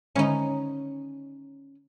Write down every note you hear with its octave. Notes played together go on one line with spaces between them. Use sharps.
D3 D#3 G#3 C#4 D#4